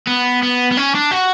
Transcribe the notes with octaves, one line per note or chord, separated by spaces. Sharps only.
B3
B3
B3
C#4
D4
F#4